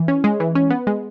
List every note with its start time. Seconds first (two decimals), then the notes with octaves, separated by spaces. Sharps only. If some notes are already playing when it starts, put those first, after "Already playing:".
Already playing: E3
0.08 C#4
0.24 G#3
0.40 E3
0.55 C#4
0.71 B3
0.87 G#3